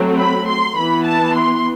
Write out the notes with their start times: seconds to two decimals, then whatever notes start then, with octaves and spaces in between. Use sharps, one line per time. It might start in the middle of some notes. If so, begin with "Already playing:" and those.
Already playing: F#3 A3 C4
0.17 B5
0.48 C6
0.76 E3 B3 B5
1.05 A5
1.35 C6